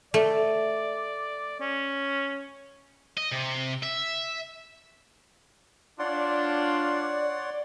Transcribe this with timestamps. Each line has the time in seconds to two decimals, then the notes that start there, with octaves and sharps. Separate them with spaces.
0.14 A3 D5
1.60 C#4
3.17 D#5
3.32 C3
3.83 E5
5.99 D4 F4 C#5 D5 F#5 C6